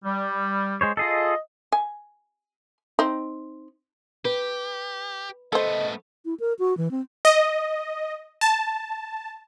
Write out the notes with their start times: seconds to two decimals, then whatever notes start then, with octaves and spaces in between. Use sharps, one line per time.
0.04 G3
0.81 G#3 C5 C#5
0.97 F4 G#4 A4 D#5
1.72 G#5
2.99 C4 D#4
4.25 G4 B4
5.53 A3 B3 A4 C5 D#5
6.25 E4
6.40 A#4
6.59 F#4
6.77 E3
6.91 C4
7.25 D#5
8.41 A5